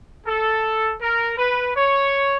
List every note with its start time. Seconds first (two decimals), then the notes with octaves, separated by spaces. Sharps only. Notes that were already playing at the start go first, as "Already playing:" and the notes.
0.27 A4
1.01 A#4
1.38 B4
1.76 C#5